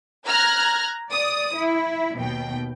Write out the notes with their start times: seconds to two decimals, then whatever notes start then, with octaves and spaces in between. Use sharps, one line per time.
0.27 A#5 F6 F#6 G#6 A#6
1.11 D5 D#6
1.55 E4
2.17 D#2 B2 G5